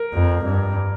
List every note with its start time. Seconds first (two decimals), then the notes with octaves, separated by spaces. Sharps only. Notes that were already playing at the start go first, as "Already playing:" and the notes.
Already playing: A#4
0.14 F2
0.45 G2